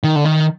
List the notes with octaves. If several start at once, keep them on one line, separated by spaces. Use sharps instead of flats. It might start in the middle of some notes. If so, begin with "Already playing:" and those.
D#3
D3
D#3